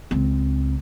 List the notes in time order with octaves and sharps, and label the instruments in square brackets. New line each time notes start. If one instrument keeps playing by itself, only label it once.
[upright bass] C#2 C4